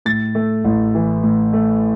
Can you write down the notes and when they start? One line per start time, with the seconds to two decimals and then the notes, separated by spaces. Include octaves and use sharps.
0.05 A2 A6
0.35 A3
0.65 A1
0.95 E3
1.23 A2
1.53 A3